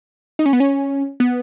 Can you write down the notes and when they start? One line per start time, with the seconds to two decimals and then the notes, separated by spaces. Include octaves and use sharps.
0.39 D#4
0.46 C#4
0.53 B3
0.60 C#4
1.20 B3